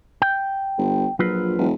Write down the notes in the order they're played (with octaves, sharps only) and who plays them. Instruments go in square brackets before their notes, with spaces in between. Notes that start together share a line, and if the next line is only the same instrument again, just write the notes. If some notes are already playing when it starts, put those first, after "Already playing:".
[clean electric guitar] G5
[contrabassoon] G1
[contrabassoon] A#1 [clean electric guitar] F#3 F4 B4
[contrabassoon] E1